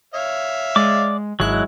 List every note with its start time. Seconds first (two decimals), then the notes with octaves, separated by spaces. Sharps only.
0.14 C#5 E5 F5
0.76 G#3 D5 D6
1.40 G#1 F#3 G#3 E4 F#6